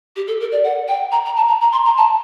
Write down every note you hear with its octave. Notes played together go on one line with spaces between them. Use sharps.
G4
A4
A#4
D5
F#5
G5
A#5
A#5
A5
A#5
A#5
C6
A#5
A5